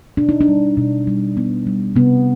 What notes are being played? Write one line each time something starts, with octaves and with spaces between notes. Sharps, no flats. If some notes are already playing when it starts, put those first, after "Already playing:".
B2 D4
D#4
D4
G3
B2
G3
B3
G3
C3 B3